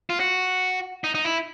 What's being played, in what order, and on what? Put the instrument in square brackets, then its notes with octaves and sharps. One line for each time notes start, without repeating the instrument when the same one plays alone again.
[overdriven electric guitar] F4
F#4
D#4
D#4
E4